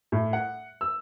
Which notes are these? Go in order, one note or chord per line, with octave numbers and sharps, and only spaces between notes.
A2
F#5
E6